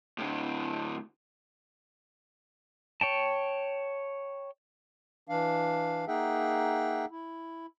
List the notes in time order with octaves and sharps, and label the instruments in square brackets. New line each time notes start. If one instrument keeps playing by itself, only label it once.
[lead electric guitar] A2 D3
[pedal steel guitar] C#5 G5 A5
[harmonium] E3 D4 F5
A#3 D#4 G#4 E5 F#5 G5
E4